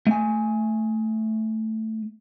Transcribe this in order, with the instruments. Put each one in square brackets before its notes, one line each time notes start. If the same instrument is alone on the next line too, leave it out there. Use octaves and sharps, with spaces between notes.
[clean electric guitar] A3 G#5